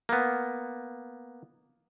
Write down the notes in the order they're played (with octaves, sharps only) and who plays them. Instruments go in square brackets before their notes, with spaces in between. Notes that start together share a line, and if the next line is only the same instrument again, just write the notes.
[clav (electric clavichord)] A#3 B3